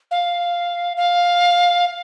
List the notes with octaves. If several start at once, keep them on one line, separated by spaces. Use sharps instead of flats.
F5
F5